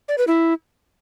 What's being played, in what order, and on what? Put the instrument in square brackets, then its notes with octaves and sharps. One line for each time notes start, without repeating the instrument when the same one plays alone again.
[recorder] D5
B4
E4